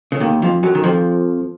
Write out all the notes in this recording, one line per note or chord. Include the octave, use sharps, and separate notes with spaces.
C#3
D#2 D#3
F2 F3
F#2 F#3
D#3
F2 F3